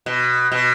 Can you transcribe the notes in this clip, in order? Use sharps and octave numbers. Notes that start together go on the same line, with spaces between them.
B2
B2